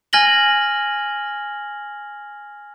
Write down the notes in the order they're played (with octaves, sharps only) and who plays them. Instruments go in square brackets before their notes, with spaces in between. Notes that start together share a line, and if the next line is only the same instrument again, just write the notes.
[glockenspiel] G#5 F6 G#6 A#6 F#7 G7